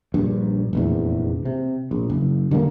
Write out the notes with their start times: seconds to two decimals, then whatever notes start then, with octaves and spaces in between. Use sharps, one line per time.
0.14 A#1 G2
0.73 F1 A#1 E2
1.45 C3
1.91 A#1
2.10 F#1
2.51 D3 G3 A3 A#3